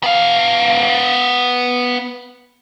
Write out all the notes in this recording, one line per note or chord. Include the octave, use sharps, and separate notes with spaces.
B3 F5